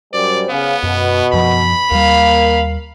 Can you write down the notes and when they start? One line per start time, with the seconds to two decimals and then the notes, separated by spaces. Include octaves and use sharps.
0.13 F#2 G3 C5 D5
0.50 C#3 B3 F5
0.83 F#2 B2
1.33 F#2 F3 B5
1.91 D#2 G3 A#3 A#4 F5